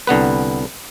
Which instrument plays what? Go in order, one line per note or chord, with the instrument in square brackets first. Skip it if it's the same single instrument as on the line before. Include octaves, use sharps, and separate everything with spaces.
[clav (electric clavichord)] C2 D3 B3 B4